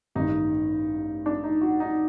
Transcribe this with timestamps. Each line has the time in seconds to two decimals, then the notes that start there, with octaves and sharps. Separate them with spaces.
0.15 A1 G2 D#3 D#4
1.26 D4
1.44 D#4
1.61 F#4
1.80 D#4